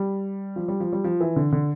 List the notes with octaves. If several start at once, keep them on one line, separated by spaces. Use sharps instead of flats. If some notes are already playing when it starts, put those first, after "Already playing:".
Already playing: G3
F3
G3
F3
G3
F3
E3
D3
D3